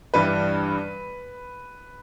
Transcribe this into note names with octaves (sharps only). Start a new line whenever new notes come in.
G2 E3 G3 B4